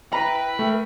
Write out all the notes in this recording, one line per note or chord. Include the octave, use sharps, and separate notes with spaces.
E4 B4 G5 A#5 B5
A3 A#4 G5